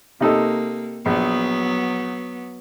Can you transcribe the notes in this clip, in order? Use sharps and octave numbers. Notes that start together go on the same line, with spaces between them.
C3 A#3 D#4 A4
A#1 F#3 B3